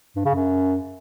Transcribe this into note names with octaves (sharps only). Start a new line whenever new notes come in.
G2
C#3
F#2